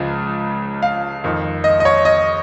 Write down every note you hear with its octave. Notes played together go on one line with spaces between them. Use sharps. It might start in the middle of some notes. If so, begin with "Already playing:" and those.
Already playing: C#2 C#3 F3
F5
F2 D#3
D#5
D#5
C#5
D#5